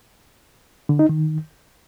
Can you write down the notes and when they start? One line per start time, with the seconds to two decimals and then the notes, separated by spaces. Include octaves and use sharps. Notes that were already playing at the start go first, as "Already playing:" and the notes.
0.89 D3
0.99 D#4
1.09 D#3